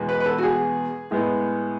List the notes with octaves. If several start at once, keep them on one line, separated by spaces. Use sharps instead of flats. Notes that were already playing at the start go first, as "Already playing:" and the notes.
Already playing: E2 B2 G#3
B4
B4
A4
F#4
G#4
A2 G#3 B3